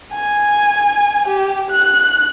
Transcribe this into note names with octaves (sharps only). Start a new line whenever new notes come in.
G#5
G4
F#6